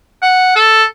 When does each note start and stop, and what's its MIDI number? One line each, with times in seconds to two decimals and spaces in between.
0.22 0.55 78
0.56 0.84 69